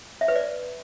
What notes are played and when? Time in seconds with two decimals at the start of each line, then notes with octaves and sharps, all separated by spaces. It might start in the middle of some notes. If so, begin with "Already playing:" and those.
0.21 E5
0.28 B4
0.35 D5